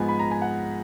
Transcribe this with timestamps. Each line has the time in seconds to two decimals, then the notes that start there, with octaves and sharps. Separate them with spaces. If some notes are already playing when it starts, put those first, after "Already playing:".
Already playing: G#2 F3 G#3 B3 G#5
0.08 B5
0.19 A#5
0.31 G#5
0.42 F#5